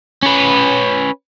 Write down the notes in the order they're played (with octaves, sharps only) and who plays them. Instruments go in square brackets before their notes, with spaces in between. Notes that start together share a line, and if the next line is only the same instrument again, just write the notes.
[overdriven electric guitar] C#4 B4